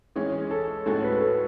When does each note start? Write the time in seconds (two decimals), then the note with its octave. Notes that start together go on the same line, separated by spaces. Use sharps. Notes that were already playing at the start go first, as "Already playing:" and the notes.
0.16 E3 G#3 C#4 G#4
0.51 A4
0.86 A2 G#3 C#4 F#4 A4
1.04 B4
1.21 A4